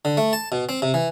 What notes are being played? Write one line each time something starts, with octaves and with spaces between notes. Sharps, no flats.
D3
A3
A5
B2
C4
C3
E3